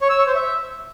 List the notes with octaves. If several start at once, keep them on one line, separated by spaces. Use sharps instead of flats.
C#5
E6
C#5
C5
E5